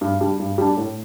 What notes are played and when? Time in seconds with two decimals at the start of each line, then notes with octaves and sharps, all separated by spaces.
0.01 G2
0.20 G3 D4
0.39 G2
0.58 G3 D4
0.77 A2